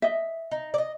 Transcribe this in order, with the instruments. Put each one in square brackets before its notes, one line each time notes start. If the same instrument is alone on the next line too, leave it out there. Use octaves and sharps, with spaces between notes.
[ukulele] D#5 E5
[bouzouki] D#4
D5 D#5